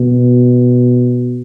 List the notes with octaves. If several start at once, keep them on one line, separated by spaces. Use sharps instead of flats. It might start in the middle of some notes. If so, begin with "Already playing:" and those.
Already playing: B2